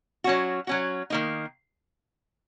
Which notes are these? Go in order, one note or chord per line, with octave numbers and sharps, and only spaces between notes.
F#3 C#4 F#4
F#3 C#4 F#4
D#3 A#3 D#4